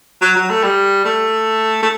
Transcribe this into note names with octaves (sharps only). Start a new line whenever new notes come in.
F#3
F#3
A3
G3
A3
A3